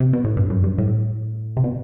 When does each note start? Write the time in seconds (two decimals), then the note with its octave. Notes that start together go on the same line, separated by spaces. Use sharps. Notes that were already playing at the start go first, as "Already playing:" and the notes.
0.00 C3
0.13 B2
0.24 A2
0.37 G2
0.50 F#2
0.64 G2
0.78 A2
1.57 C3
1.64 B2